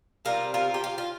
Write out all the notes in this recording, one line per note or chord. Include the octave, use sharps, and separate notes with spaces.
C3 G3 C4 F4 A#4
F4 A#4
G4
F4
F4